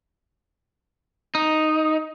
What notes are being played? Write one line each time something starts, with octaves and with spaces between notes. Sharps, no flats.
D#4